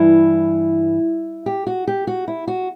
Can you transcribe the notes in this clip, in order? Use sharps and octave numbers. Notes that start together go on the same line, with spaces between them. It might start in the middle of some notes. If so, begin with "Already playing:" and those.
Already playing: G2 E3 E4
G4
F#4
G4
F#4
E4
F#4